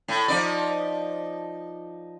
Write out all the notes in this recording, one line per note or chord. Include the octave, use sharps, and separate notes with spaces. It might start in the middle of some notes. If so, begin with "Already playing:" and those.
A2
F3 D#4 D5